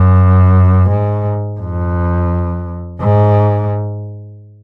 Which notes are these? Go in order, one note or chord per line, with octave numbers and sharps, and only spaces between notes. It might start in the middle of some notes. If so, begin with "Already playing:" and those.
Already playing: F#2
G#2
F2
G#2